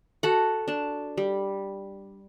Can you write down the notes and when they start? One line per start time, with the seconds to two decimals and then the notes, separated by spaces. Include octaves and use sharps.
0.23 F#4 A4 F#5
0.68 D4 A5
1.17 G3